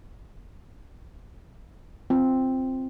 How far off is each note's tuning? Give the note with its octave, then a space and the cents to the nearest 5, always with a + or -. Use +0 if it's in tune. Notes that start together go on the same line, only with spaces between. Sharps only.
C4 +0 F4 +0